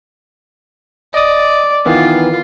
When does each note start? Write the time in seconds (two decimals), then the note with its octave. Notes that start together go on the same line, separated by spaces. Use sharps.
1.14 D5 D#5 D#6
1.86 D#3 E3 B3 F4